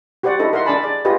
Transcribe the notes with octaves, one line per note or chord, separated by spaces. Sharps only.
F#4 G4 C5 D5 F#5
D#4 E4 A4 D#5
A#4 E5 F#5 C6
D4 G#4 D5 G#5 A5 B5
D5
F4 G4 G#4 B4 D#5